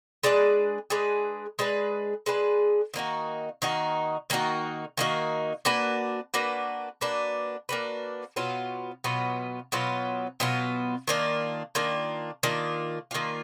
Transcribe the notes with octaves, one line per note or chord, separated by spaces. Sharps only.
G#3 D4 G#4 B4
G#3 D4 G#4 B4
G#3 D4 G#4 B4
G#3 D4 G#4 B4
D#3 A#3 D#4 F#4
D#3 A#3 D#4 F#4
D#3 A#3 D#4 F#4
D#3 A#3 D#4 F#4
A#3 D4 F#4 B4
A#3 D4 F#4 B4
A#3 D4 F#4 B4
A#3 D4 F#4 B4
B2 F#3 B3 F4
B2 F#3 B3 F4
B2 F#3 B3 F4
B2 F#3 B3 F4
D#3 A#3 D4 F4
D#3 A#3 D4 F4
D#3 A#3 D4 F4
D#3 A#3 D4 F4